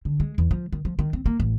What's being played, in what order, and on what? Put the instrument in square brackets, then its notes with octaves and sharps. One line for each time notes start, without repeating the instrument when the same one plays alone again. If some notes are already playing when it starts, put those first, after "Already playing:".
[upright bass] D3
G#3
E2
F3
D#3
F3
D#3
C4
A#3
A1